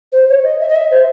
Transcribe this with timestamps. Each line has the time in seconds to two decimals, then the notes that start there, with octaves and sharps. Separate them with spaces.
0.12 C5
0.29 C#5
0.43 D#5
0.60 E5
0.69 D#5
0.76 E5
0.90 C5